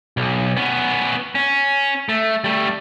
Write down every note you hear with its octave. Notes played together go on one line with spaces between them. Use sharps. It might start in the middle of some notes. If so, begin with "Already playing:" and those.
B1
B3 C#4
C#4
A3
G3 A3